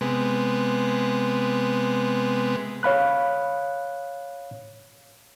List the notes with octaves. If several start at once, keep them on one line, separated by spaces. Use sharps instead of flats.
C3 G#3 B3
C#5 F5 B5 F#6